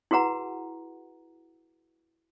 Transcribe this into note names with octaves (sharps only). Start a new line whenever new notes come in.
E4 F#4 G#4 B4 F#5 A#5